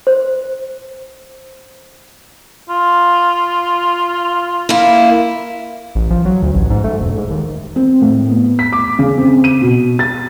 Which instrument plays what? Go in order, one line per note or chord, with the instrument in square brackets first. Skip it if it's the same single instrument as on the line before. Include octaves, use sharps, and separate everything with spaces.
[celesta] C5
[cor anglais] F4
[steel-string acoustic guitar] A#3 E4
[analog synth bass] A1
F3
F#3
D2
A1
G#2
A3
E1
G#2
D#2
[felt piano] C4
A2
B3
B6
D6
C#3
C4
D#7
B2
A6